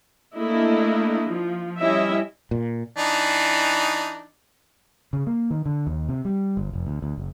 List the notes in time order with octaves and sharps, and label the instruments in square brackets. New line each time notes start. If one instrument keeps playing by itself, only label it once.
[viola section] A3 A#3 D4 E4 D#5
F3
G3 C#4 E4 D#5 E5
[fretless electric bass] A#2
[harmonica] E3 D4 D#4
[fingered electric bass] C#3
A#3
D#3
D3
D#2
C3
G3
G1
F1
D2
D2
F#1